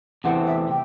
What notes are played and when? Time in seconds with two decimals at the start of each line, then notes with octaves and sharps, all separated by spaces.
0.24 E2 C3 E3 A3 C4 F#5
0.46 E5
0.69 C3 G5